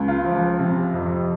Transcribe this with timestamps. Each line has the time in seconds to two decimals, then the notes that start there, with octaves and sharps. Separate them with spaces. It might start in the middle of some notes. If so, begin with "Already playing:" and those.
Already playing: C#2
0.08 F4
0.25 F3
0.59 C3
0.94 F2